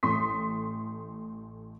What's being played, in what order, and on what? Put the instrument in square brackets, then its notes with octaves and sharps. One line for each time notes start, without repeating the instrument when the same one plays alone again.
[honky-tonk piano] A1 A3 C6 D#6 B6